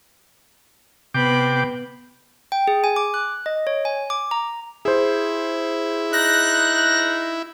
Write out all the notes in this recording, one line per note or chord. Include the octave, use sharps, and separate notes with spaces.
C3 B3 G5 B5 D6
G5
G#4
G#5
D6
F#6
D#5
C#5
G#5
D6
A#5
E4 G#4 C5
D#4 F#6 A#6